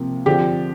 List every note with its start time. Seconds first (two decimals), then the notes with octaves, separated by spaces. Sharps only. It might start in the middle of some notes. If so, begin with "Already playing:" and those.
Already playing: C3 F3 A#3
0.26 D3 F3 C4 G4